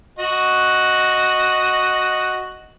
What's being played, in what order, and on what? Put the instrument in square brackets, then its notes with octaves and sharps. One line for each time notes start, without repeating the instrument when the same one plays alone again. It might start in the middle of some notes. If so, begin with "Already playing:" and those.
[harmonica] F#4 D#5